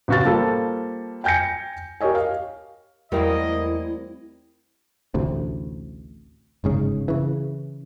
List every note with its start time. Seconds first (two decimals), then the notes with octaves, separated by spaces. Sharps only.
0.08 A1 C#3 F#4 F5 A6
0.25 F3 G3 A#3 A4
1.24 G5 G#5 G6 A#6 C#7
2.01 G4 A#4 C#5 D#5 G#5
2.15 F5
3.12 E2 G3 A3 A#3 C4 E4 A#4 D#5
5.14 A1 D2 C3
6.64 G1 G#2 C#3
7.08 C#3 E3